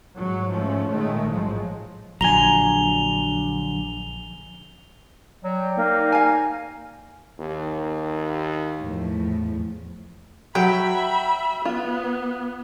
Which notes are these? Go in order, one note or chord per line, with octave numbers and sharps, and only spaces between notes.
G#2 F#3
G#2 F3 A3 C#4
A#2 D#3 G#3 A3
A1 G#2 F3 F#3 G#3
A#1 D3 F#3 G#5 A#5 F7 G7
F#3 D5 G5
A#3 D#4
F5 G#5
D#2
E2 A2 F3
F#3 F#4 E5 G5 B5
B3 F4